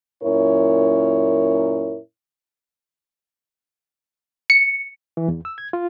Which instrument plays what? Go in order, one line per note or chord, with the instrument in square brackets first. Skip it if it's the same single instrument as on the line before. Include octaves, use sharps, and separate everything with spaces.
[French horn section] F#2 A#2 C#4 E4 A#4 C#5
[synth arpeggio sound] C#7
[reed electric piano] E3
E2
E6
G#6
F4